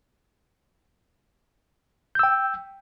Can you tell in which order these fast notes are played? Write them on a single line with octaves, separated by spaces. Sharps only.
G6 E6 G5